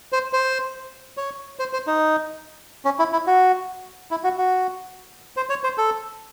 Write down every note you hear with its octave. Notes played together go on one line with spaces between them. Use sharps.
C5
C5
C#5
C5
C5
D#4
C#4
E4
E4
F#4
E4
F#4
F#4
C5
C#5
C5
A4